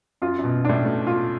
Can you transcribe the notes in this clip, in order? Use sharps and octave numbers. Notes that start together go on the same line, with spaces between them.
F#2 F4
F#2
B2
A2 D4
B2 A3
F4